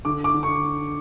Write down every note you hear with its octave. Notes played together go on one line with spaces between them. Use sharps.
D3 D6
D6
D3
C#6